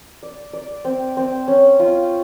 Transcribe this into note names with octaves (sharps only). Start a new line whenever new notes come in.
D5
D5
C4
C4
C#4
F4